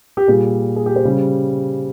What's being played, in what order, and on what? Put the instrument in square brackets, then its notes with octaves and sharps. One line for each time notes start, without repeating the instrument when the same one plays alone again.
[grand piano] G4
A#2 G3 G#4
G#4
G4
C5
C#3 G3